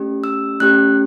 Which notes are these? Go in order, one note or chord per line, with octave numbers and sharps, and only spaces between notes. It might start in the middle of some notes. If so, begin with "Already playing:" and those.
Already playing: A3 C#4 G4
E6
A3 C#4 G4 F#6